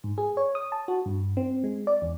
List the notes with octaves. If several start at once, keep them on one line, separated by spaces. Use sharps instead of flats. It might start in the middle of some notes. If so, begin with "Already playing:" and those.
G#2
G#4
C#5
D#6
A5
F#4
G2
C4
G#3
D5
E2